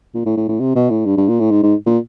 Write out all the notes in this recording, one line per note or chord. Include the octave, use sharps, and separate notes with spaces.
A#2
A2
A2
A2
C3
B2
A2
G2
G2
A#2
A2
G#2
G#2
A#2